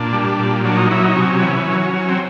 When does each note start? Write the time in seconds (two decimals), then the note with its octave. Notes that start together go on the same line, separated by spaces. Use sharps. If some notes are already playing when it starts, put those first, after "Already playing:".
Already playing: A#2 D4
0.13 G3
0.39 A#2
0.64 F#3 D4
0.77 D#4
0.91 F#3 E4
1.04 D#4
1.16 C3 C#4
1.42 E3
1.67 F#3
1.94 F#3
2.09 C4